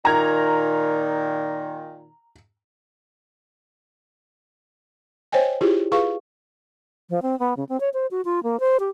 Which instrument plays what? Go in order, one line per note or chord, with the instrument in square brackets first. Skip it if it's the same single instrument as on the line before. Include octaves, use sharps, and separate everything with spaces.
[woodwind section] A#2 D#3 [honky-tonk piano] A#5 G#6
[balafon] C5 C#5 D#5 G5 G#5
E4 F4 G4 G#4
F4 G#4 B4 F5 C#6
[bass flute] F3
C4
B3
C#3
C4
C#5
C5
F#4
F4
A#3
C5
G4